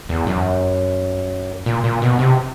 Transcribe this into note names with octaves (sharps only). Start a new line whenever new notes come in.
E2
F#2
A#2
A#2
B2
C3